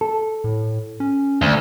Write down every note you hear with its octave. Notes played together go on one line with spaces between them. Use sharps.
A4
A2
C#4
D2